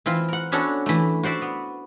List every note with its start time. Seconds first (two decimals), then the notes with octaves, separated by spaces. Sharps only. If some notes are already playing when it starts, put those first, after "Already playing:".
0.06 E3 C4 F4
0.28 A#4 F#5
0.52 B3 C#4 D4 F#4 A4
0.86 E3 A3
1.23 F#4 C5 D5 E5
1.42 B3